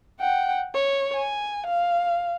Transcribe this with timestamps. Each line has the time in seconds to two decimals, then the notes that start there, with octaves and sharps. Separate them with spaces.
0.20 F#5 G5
0.74 C#5
1.16 G#5
1.67 F5